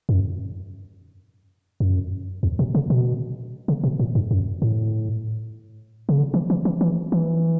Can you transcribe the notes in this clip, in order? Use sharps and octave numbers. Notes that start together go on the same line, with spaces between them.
G2
F#2
F#2
E2
B2
C#3
B2
C#3
B2
A2
G2
F#2
A2
C#3
D3
E3
E3
E3
E3
E3